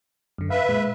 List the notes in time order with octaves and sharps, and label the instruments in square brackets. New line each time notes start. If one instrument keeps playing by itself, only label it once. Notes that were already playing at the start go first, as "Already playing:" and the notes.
[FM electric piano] F#2 D3
[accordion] B4 E5 [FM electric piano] F5
[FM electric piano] A#2 G#3